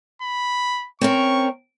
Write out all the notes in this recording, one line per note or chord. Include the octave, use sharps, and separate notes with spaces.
B5
C4 C#4 A#4 C#6